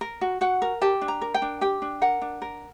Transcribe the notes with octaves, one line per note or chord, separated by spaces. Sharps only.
A#4
F#4
F#4 F#5
A#4
G4 A5
D4
A#5
A#4
G5
D4
G4 G5
D4
A#4 F#5
D4
A#4